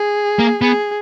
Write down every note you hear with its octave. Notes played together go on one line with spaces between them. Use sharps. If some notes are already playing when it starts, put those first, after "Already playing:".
Already playing: G#4
A#3
B3 G#4